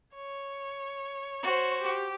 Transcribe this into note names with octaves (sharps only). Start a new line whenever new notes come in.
C#5
F#4 C5
G4